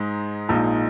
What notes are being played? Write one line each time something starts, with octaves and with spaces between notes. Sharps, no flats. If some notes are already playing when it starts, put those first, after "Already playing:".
Already playing: G#2 G#3 D#4
A#1 A#2 G#3 D#4